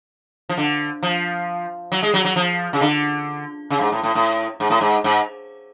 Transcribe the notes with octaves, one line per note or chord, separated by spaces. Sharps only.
F3
D3
F3
F#3
G#3
F#3
F#3
F3
C#3
D3
C#3
G#2
A2
A2
A2
G#2
A2
G#2
G#2